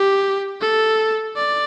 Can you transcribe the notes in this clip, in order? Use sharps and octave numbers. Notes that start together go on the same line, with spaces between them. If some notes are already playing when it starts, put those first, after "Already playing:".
Already playing: G4
A4
D5